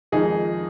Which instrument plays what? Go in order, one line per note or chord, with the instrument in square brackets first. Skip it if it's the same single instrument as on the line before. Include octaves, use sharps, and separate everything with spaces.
[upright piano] F2 D#3 G#3 D#4 G#4